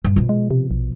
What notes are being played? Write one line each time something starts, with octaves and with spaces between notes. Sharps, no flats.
G2
B2 F3
G#3
C3
A#1